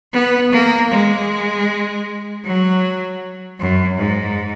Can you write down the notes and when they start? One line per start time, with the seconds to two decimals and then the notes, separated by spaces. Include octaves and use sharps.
0.13 B3
0.52 A#3
0.91 G#3
2.45 F#3
3.59 F#2
3.98 G#2